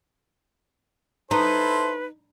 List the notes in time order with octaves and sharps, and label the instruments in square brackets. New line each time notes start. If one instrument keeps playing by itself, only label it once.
[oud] D#4 [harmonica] E4 A4 C5 [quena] B4